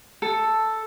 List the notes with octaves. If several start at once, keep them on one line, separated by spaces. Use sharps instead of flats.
A4